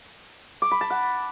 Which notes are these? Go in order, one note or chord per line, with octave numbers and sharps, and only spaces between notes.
D6
B5
A5
F#5